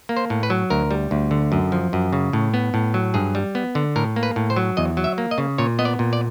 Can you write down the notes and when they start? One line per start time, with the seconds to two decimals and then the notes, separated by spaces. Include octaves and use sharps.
0.09 A#3
0.17 C5
0.30 A2
0.43 B4
0.50 F#3
0.70 D2 A#4
0.91 G3
1.11 D2
1.31 D3
1.52 F#2
1.72 F3
1.93 F#2
2.13 C#3
2.33 A2
2.54 B3
2.74 A2
2.94 F#3
3.14 G2 G#4
3.35 G3
3.55 B3
3.75 D3
3.96 A2 A#4
4.16 A#3
4.23 B4
4.36 A2
4.50 C5
4.56 F#3
4.77 E2 D#5
4.97 F#3
5.04 E5
5.18 A#3
5.31 D#5
5.38 C#3
5.58 A#2 C#5
5.79 B3 D#5
5.85 D5
5.99 A#2
6.13 D5